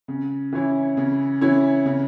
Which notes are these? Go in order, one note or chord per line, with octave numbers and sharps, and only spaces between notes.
C#3
E3 C#4 E4
C#3
E3 C#4 E4
C#3